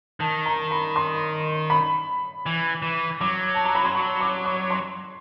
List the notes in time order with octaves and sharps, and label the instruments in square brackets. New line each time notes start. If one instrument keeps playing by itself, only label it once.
[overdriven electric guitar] D#3 [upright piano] A5
[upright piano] A#5
B5
C6
B5
[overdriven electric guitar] E3
E3
[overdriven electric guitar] F#3 [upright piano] D6
[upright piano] A5
A#5
B5
C6
C#6
D6
C#6
C6